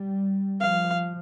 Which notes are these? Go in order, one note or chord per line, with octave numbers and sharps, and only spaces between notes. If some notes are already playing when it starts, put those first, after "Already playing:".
Already playing: G3
F3 F5